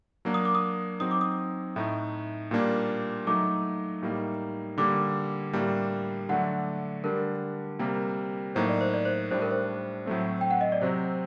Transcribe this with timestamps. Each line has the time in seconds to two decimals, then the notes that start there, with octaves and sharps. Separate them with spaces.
0.25 F#3 A#3 D4
0.34 D#6
0.45 D6
0.55 D#6
1.00 F#3 C4 D#4 D#6
1.11 D6
1.21 D#6
1.76 A2 A3 D#4
2.51 A#2 G3 A#3 D4
3.27 F#3 A3 D#4 D6
4.02 A2 G3 A#3 D#4
4.78 D3 G3 A#3 D6
5.53 A2 G3 A#3 D4
6.29 D3 F#3 A3 D4 F#5
7.04 D3 G3 D4 A#4
7.79 C3 G3 A#3
8.55 A2 F#3 A#3 D#4 C5
8.69 D5
8.81 C5
8.94 D5
9.05 C5
9.31 A2 G3 D4 C5
9.42 A#4
9.51 C5
10.06 A2 F#3 A3 C4
10.41 G5
10.51 F#5
10.61 D#5
10.72 D5
10.81 C3 F#3 C4 C5